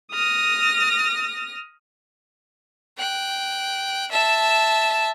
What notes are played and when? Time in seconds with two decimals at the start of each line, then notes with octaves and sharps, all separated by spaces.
0.12 D#6 F6 A#6
2.98 G5 F#6
4.11 E5 A5